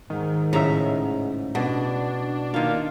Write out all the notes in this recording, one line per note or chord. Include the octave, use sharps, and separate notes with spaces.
G#2 D#3
A2 C#3 E5 A#5
B2 D4
D#3 A#3 F4